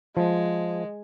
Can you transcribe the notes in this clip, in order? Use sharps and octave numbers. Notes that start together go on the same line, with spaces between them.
F3 G#3